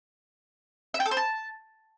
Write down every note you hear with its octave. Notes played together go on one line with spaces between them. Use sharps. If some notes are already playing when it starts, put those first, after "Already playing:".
E5
G5
A4
C5
A5